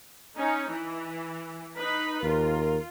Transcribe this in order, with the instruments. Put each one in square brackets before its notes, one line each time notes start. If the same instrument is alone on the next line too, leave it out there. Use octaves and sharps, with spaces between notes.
[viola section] C#4 D#4
E3
D#4 B4 B5
[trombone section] D#2 A#4 [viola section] F4